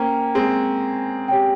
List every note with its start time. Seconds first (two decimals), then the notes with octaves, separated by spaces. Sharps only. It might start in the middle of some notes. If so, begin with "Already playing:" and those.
Already playing: A#3 C#4 C5 G5 A#5
0.35 G#3 C4
1.28 G4 C#5 G5